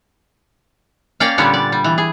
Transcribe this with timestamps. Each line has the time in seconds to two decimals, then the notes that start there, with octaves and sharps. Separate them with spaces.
1.20 A#3 C#4 D5 F5 G5
1.38 A#2 D3 G3 B3 C#4
1.54 D5
1.72 G3
1.84 E3
1.98 G#4